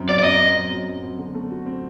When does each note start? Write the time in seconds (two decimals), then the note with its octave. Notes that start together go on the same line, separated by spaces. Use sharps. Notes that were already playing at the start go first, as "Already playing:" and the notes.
Already playing: F#2 C4
0.08 F#3 D5
0.19 D5
0.24 F#2 D#5
0.40 C4
0.56 F#2
0.72 F#3
0.88 F#2
1.03 C4
1.19 D3
1.34 A3
1.50 F#4
1.66 C4